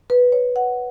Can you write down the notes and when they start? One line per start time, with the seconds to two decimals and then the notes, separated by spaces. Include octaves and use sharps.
0.10 B4
0.32 C#5
0.56 F#5